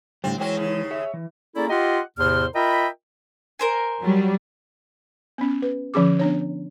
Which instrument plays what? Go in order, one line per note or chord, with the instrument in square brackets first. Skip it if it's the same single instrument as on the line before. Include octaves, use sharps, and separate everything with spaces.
[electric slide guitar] A2 D3 G3 [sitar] C4
[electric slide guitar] E3 G#3 [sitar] F#3 C4 C#4
[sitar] D#2 C#3
[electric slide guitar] G#4 C#5 E5
E3
[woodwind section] A#3 C#4 E4 G#4 A4 D5
F4 G4 D#5 F#5 C6
E2 A2 C3 C5 C6 F6
F4 A#4 D#5 E5 G5 B5
[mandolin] A#4 C5 G#5
[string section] F#3 G3
[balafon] B3 C#4
B4
D3 F3 C#4 G#4 D6
B3 D4 C#5